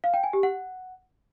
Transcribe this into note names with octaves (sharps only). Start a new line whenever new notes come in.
F5
G5
G#5
G4
F#5